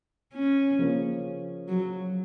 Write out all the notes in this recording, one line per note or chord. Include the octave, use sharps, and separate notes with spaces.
C#4
C#3 F3 A#3 C#4
F#3